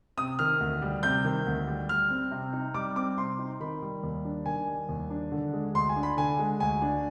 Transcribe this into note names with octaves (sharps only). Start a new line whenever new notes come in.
C3 D#6
D#3 F6
D2
G3
C3 G6
D#3
D2
G3
G3 F6
C4
C3
D#4
G3 D6
C4 D6
C3 C6
D#4
D#3 B5
G3
D#2
D4
D#3 G#5
G3
D#2
D4
D3
G#3
D2 C6
G#5
D4
B5
D3 G#5
G#3
D2 G#5
D4